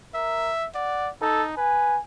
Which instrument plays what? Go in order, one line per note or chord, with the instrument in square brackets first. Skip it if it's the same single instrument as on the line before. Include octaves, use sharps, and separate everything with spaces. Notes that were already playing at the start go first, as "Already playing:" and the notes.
[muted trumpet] A#4 [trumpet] E5
[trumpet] D5 [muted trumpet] F#5
[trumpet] D#4 [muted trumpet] A4
[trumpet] B4 [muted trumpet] G#5